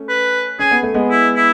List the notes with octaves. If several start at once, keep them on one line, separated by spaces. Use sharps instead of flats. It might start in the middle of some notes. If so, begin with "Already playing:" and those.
Already playing: A3 C#4
B4
C#4 G#4
B3
A3
G#3 B3
E4
E4